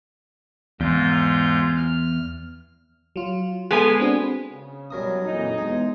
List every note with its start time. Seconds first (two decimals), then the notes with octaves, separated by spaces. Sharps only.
0.81 E2 G#2 F4 G6
1.76 F6
3.16 F#3 F4
3.71 G#3 B3 G#4 A4 G#5
4.00 C4 D4 F#4
4.51 C#3
4.90 F#2 B2 E3 F#3 G3 A#4 D#6
5.23 F2 A#2 E3 D#4
5.58 E2 G#3 G#4